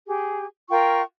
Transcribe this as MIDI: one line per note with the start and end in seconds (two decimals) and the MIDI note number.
0.06 0.46 67
0.06 0.46 68
0.70 1.02 65
0.70 1.02 70
0.70 1.02 79
0.70 1.02 85